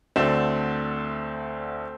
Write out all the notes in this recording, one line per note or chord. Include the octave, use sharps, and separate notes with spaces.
D2 D3 A3 C4